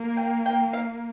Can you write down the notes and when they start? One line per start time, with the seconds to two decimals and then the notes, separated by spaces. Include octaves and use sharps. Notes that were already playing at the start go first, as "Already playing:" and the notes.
Already playing: A#3
0.17 G5
0.46 G5
0.73 F5